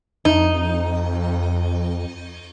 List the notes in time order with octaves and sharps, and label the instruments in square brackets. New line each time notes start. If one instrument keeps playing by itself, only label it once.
[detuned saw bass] F2 [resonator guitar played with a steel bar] D#4